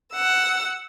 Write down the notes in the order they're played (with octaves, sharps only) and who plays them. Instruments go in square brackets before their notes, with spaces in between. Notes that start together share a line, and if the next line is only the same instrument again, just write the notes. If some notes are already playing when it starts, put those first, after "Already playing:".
[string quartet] F#5 E6